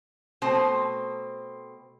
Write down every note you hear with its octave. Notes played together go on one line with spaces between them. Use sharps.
B2 A3 C4 C5